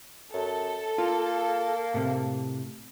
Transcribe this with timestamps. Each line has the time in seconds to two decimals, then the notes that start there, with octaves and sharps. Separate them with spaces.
0.34 F#2 A4
0.98 A#3 F4
1.94 A2 C3